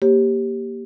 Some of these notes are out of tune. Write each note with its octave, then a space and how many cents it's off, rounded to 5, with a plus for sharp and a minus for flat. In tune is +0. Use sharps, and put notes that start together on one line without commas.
A#3 +10 G4 +0 C#5 -40